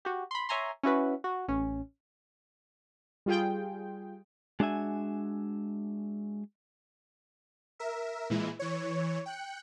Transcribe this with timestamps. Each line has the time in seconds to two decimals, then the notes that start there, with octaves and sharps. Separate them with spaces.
0.05 F#4 G4
0.31 B5 C6
0.49 C#5 E5 G#5 A#5 C6
0.83 C#4 E4 F#4 B4
1.24 F#4
1.48 A1 C#4
3.26 G3 F4 G#4 G5
4.60 G#3 D4 F#4 E5 G#5
7.80 A#4 E5
8.30 A#2 E3 G#3 E4
8.59 E3 C#5
9.26 G5 F#6 C#7